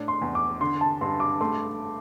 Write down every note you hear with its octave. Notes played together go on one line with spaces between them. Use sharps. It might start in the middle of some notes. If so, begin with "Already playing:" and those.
Already playing: A2 D4
C6
E2
D6
D3 C6
A5
G2 C6
D6
A3 C6